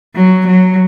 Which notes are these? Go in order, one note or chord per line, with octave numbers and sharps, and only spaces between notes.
F#3
F#3